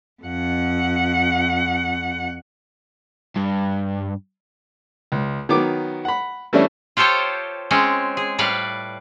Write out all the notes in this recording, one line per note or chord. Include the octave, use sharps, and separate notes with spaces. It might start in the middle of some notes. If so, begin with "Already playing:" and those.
F2 F#5
G2
C#2
D#3 F#3 B3 D6
F#5 B5
E3 G3 A3 C#4 D4 E4
F4 G4 A4 C5 C#5 G5
G#3 C4 C#4
G#4
A2 G3 B4 D5 F5